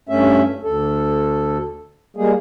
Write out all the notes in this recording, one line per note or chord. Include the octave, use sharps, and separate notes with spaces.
G2 A3 C#4 E5
D2 A4
G3 G#3 A#3 G#4